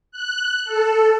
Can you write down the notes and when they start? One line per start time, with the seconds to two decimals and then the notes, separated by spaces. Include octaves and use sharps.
0.12 F#6
0.65 A4